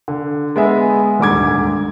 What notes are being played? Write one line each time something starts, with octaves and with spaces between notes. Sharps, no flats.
D3
G#3 B3 G#4 E5
D#1 D2 G#2 D6 G#6